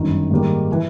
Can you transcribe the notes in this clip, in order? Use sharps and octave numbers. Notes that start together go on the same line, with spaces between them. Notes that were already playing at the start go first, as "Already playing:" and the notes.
Already playing: G1 F#2 D#3
G#2 D#3 G3 A#3
E3